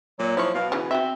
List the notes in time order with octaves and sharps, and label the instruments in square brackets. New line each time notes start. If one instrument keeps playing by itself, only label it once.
[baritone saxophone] A#2 [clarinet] F#3
[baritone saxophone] F3 [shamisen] E4 C#5
[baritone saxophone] B2 [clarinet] F5
[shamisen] C#3 E3 [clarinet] C#4
[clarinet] C4 [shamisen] F#4 E5